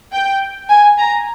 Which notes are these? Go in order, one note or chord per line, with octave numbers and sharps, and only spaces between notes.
G5
G#5
A#5